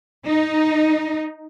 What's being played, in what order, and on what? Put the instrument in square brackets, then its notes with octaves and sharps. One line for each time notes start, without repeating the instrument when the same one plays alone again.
[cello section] D#4